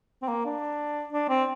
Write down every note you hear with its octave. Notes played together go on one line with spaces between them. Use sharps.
C4
A#3
D4
D4
C4